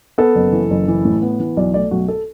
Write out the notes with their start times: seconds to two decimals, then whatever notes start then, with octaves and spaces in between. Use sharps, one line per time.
0.18 B3 A4
0.35 F#1
0.52 E3
0.70 F#1
0.88 E3
1.05 A2
1.22 B3
1.40 E3
1.57 B1 D5
1.74 A3 D5
1.91 B1 F#4
2.08 A4